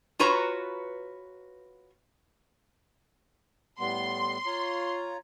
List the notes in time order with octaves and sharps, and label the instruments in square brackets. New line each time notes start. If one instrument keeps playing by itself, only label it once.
[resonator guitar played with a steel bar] F4 F#4 B4 C#5 A#5
[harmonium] A2 G3 B3 [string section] C6
[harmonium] F4 C#5 A#5